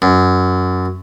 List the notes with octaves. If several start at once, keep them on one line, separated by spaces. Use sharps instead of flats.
F#2